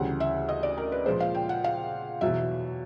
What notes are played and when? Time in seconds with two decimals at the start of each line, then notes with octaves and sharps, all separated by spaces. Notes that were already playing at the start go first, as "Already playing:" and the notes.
Already playing: D2 C#3 E3 G3 F#5
0.20 E5
0.49 D#5
0.63 D5
0.78 A#4
0.92 B4
1.06 A#2 F3 G#3 C5
1.20 F5
1.35 G5
1.49 F#5
1.64 F5
2.21 E2 B2 F#3 E5